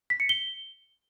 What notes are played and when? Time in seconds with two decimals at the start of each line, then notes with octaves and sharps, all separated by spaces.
0.10 B6
0.20 C#7
0.29 G7